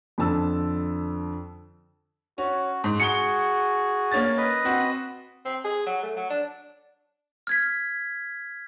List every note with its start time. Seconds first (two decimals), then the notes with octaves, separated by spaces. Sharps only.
0.18 F2 D3 A4 A5 E6
2.38 C#4 F#4
2.84 G#2
3.00 F#4 G#4 C#7 G7
4.12 A#3 C#4 A6
4.37 B4 D#5
4.65 C4 F#4
5.45 C4
5.64 G#4
5.86 F#3
6.03 A3
6.16 F#3
6.30 D4
7.47 F6 G#6 B6